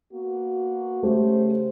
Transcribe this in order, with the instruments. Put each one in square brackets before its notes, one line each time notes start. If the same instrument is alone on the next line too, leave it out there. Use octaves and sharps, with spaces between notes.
[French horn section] A#3 B3 F#4
[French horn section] C#3 C5 [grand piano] A3 G4